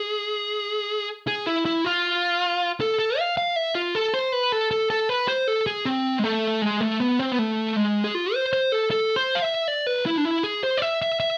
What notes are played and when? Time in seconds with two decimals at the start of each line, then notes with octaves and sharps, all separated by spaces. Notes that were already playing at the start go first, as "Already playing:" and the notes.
Already playing: G#4
1.27 G#4
1.47 E4
1.65 E4
1.85 F4
2.80 A4
2.99 A4
3.19 F5
3.37 F5
3.56 E5
3.75 F4
3.95 A4
4.14 C5
4.33 B4
4.52 A4
4.71 A4
4.90 A4
5.09 B4
5.28 C5
5.48 A4
5.67 G#4
5.85 C4
6.19 G#3
6.24 A3
6.62 G#3
6.81 A3
7.00 B3
7.19 C4
7.32 B3
7.39 A3
7.76 G#3
8.04 G#4
8.15 F4
8.34 C5
8.53 C5
8.72 A4
8.91 A4
9.16 C5
9.35 F5
9.42 E5
9.68 D5
9.87 B4
10.06 E4
10.17 D4
10.25 E4
10.43 G#4
10.63 C5
10.77 D5
10.82 E5
11.02 E5
11.20 E5